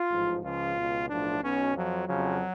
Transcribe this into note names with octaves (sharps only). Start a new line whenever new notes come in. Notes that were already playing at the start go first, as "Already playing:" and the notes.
Already playing: F4
A1 G#2 F3
C#2 C#3 F3 F4
C#2 B2
B1 A2 F3 D4
B1 B2 C#4
F2 F3 F#3
F2 C#3 F3 F#3